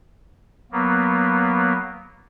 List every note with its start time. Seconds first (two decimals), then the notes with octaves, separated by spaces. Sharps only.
0.72 F#3 A#3 B3